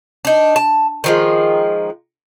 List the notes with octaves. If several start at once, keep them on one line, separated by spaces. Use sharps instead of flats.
D4 D#4
A5
D#3 F3 G#3